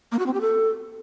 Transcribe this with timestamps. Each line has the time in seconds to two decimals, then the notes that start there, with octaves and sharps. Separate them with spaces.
0.12 A#3
0.19 F#4
0.26 C4
0.34 G4
0.41 A4